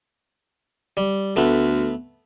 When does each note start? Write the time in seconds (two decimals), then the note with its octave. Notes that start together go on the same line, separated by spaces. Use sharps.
0.97 G3
1.36 D2 A3 B3